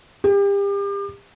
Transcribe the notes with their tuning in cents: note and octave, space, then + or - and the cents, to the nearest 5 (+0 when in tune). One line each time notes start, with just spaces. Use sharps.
G4 +35